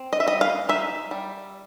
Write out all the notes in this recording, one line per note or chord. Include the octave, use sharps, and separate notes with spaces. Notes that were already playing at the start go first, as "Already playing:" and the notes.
Already playing: C4
D#5
E5
G3 D#5
F5
D#4 E5
G3